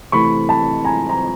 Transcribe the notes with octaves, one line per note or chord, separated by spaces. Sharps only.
C3 E3 A3 B5 C#6
A5 B5
G#5 A#5
A#5